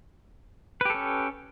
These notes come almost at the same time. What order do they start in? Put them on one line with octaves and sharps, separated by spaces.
B4 G4 A4 C#4